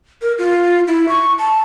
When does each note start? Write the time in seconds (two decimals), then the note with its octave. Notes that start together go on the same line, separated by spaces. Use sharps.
0.22 A#4
0.38 F4
0.88 E4
1.09 C#6
1.39 A5